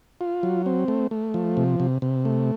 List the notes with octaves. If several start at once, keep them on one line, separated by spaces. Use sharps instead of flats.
F4
F#3
C4
A3
A3
F3
C3
C3
C3
A3